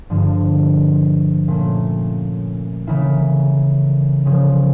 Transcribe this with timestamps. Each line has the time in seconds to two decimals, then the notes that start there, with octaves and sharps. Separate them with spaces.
0.10 G2 D3 F3
1.48 A#2 A3 C#4
2.87 C#3 E3 A#3 E4
4.25 C#3 F3 C#4